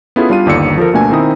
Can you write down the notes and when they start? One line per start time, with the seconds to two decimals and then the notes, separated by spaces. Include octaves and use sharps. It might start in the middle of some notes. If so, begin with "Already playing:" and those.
0.16 B3 C#4 E4 F4 G#4 A4
0.30 G3 D4 F4 F5 D#7
0.46 G1 D#2 D3 D5 E6 C#7
0.78 F3 A4 A#4
0.93 D2 B2 A3 A#3 D4 G#5
1.10 D#3 C4 D#4 E4 D#6